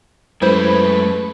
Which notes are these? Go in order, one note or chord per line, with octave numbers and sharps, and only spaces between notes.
F#2 G#3 A3 E4 B4 C5